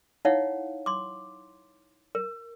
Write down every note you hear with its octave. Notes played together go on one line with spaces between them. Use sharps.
D#4 E4 C#5 F5 F#5
C6 D6
A#4